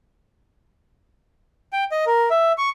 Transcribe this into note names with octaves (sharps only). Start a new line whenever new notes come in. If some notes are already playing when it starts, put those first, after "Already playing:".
G5
D#5
A#4
E5
C#6